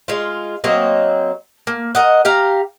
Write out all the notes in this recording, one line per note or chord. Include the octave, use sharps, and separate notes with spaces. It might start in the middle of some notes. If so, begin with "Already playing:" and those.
G#3 F4
F#3 A#3 C4 D#5
A#3
A#4 D#5 F#5
G4 F5 A#5